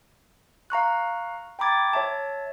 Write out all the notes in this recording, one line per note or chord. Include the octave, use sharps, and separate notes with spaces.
F5 A#5 C#6 F#6
G5 A#5 B5 D6 G#6 A6
C#5 E5 A5